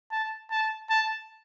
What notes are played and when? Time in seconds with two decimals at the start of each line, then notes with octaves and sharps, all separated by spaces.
0.12 A5
0.51 A5
0.90 A5